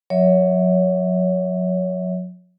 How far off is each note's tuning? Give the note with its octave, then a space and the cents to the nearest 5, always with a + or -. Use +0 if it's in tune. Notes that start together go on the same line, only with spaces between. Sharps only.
F#3 -40 C#5 +20 E5 -30